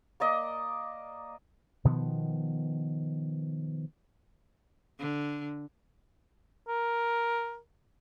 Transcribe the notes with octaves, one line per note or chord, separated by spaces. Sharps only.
A#3 D5 D#5
B2 D#3 F3 B3
D3
A#4